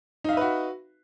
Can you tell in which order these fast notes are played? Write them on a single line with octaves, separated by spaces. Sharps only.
D#4 F5 E5 B4 F#4